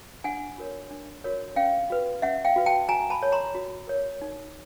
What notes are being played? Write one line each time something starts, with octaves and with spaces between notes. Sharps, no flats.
D4 F#5 G#5
F#4 A#4 C#5
D4
F#4 A#4 C#5
C#4 F5 G5
F#4 B4
C#4 E5 F#5
F5 G5
F#4 B4
G5 A5
F#4 G#5 A#5
A5 B5
A#4 C#5
A#5 C6
F#4
A#4 C#5
D#4